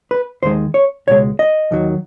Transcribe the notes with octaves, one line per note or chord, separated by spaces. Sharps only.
B4
D#2 D#3 G#3 C5
C#5
C#2 B2 G#3 C#5
D#5
D#2 D#3 F#3